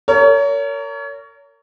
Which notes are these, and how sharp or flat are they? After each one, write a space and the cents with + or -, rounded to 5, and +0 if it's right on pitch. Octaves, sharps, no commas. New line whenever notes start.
A#4 -25 C#5 +30